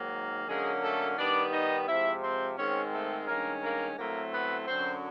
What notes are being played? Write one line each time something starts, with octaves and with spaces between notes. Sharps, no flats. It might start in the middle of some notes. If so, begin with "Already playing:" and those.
Already playing: G#2 D#3 F#3 A#3
D3 F#3 G#3 A#3 C#4 G#4
A3 A4
D#3 G3 B3 D4 D5
D#4 D#5
C3 F3 G#3 E4 E5
C4 C5
G#2 D#3 G#3 C4 C#4 C#5
A3 A4
G2 D#3 G#3 A#3 C#4 A#4
A#3 A#4
A2 F#3 A3 A#3 C4 A#4
B3 B4
F#2 D3 F#3 C4 C5